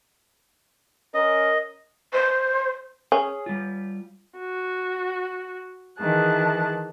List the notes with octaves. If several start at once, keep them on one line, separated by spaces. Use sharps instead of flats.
C#4 A#4 D#5
C5
C#4 G#4
G3 F4
F#4
D#3 E3 G#4 A5 F#6